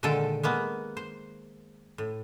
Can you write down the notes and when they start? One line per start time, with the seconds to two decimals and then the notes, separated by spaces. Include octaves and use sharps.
0.03 A#2 D3 D#3 G#3 A4 G5
0.43 G#3 A#3 B3
0.97 C5
1.98 A2